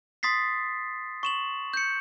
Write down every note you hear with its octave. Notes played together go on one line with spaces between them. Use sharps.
C6 D#6 A6 B6 C7
C#6 E7 F#7
G6 C#7